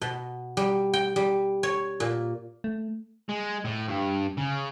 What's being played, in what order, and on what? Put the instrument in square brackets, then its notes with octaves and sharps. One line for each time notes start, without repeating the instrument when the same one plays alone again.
[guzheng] B2
G3
G5
G3
C#5
A#2
[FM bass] A3
[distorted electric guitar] G#3
A2
G2
C#3